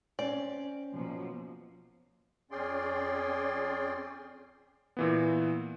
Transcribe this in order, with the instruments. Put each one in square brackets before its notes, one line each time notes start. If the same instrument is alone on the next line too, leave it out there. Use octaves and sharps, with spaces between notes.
[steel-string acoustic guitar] C4 C#4 [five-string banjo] D5
[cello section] B2 F3 A#3
[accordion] F2 C#4 G#4 D5 G5 C6
[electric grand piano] A#2 E3 B3